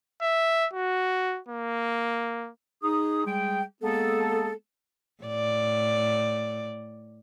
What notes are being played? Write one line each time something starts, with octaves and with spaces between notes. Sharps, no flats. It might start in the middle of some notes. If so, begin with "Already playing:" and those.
E5
F#4
A#3
D#4 G#4 D#6
G3 G#3 G#4 G5
G#3 A#3 B3 G#4 A4
A2 D5